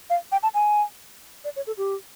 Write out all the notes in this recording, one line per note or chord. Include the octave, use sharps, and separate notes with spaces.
F5
G5
A5
G#5
D5
C#5
A4
G4